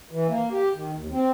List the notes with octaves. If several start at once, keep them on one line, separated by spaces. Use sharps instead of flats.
E3
A#3
G4
D#3
D#2
C4